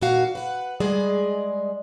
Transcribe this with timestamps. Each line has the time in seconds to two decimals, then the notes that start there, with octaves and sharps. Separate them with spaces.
0.01 A#2 D#3 F#4 F5
0.35 B4 F#5
0.80 G3 G#3 G#4 D5 D#5